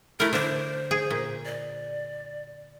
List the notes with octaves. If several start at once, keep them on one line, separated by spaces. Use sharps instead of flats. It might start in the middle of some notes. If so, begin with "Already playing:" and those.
A3 E4 A#4
D3 D4 C5
G#4
A#2
D5